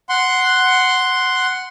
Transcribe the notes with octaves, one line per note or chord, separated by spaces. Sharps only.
F#5 C6